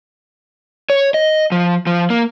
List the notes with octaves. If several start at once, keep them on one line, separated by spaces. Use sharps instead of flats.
C#5
D#5
F3
F3
A#3